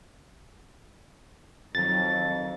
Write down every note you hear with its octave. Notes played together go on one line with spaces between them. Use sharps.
F2 D#3 F#3 A6